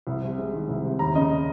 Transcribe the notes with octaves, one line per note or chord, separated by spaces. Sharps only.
C2
C3
G#3
D#3
C2
C3
D#2 A#5
C#3 D#5